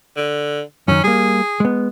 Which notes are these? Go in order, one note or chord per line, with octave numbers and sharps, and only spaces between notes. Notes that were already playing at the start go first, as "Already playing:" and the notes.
D3
F#2 D#3 C#4
G3 A#3 G#4
G#3 B3